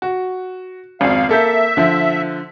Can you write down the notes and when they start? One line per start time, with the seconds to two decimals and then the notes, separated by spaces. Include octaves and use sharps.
0.02 F#4
1.01 G#1 F2 F5
1.29 A#3 A4 E5 G6
1.77 D3 F3